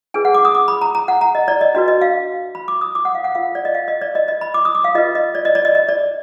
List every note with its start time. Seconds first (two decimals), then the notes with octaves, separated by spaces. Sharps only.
0.14 D4 G#4 B4 G#5
0.25 F#5
0.34 D6
0.45 D#6
0.55 D6
0.68 B5
0.81 A#5
0.95 A#5
1.08 F#5
1.21 A#5
1.35 D#5
1.48 D5
1.61 D#5
1.75 D4 F#4 B4 D#5
1.88 D#5
2.01 F5
2.55 B5
2.68 D6
2.81 D#6
2.95 D6
3.05 F#5
3.15 F5
3.24 F#5
3.35 F4 A#4 F5
3.55 D5
3.65 D#5
3.75 F5
3.88 D#5
4.02 D5
4.15 D#5
4.28 D#5
4.41 B5
4.54 D6
4.65 D#6
4.75 D6
4.84 F5
4.95 F4 B4 D#5
5.15 D#5
5.35 D5
5.45 D#5
5.55 D5
5.65 D#5
5.75 D#5
5.89 D5